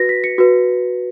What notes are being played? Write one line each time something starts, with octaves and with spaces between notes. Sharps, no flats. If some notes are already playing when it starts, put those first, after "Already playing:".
Already playing: F#4 B4 A#6
B6
C#7
F#4 B4